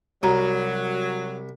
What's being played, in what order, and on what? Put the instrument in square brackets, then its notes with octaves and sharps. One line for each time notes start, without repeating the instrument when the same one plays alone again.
[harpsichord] C2 [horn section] F#3 [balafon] F#4 A#5